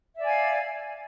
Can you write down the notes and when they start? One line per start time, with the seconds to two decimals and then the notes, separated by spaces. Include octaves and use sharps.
0.15 E5
0.19 D5
0.23 G#5
0.27 F5